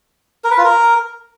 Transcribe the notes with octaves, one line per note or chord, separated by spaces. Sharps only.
A#4
B4
F4
A#4